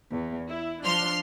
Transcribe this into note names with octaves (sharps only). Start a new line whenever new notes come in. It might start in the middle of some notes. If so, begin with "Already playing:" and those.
E2
E4
F3 D4 C6 F6